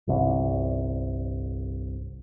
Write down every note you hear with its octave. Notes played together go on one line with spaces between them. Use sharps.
G1 C2